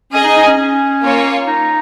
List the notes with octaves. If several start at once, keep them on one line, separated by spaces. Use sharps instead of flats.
C#4 G#4 D#5 G#5
D#4
D#4
C#4
C#4
A#3 F4 C#5
D#4